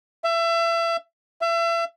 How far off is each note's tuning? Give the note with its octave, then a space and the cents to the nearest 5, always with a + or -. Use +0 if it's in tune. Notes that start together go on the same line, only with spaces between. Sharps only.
E5 +30
E5 +35